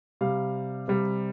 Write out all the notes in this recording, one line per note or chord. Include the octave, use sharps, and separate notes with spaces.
C3 G3 F5
C3 G3